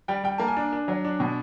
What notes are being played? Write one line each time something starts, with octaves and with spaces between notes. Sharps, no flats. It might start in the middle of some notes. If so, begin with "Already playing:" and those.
G3 G5
G3 G5
A#3 A5
G#5
D4
D4
F#3
D4
B2